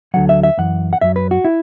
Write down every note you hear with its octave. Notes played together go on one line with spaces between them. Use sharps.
D2 D3 F#3 F#5
E5
E5
F#2 E3 F#5
F#5
F#2 F#3 E5
B4
F#4
E4